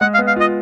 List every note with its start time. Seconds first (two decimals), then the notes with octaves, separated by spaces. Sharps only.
0.01 G#3 F#5
0.14 F5
0.18 B3
0.27 F5
0.36 F4 D#5